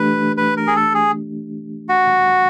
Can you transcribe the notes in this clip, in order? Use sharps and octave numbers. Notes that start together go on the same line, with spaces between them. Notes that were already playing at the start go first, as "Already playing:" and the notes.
Already playing: E3 A3 D4 G4 B4
B4
A#4
G#4
A4
G#4
F#4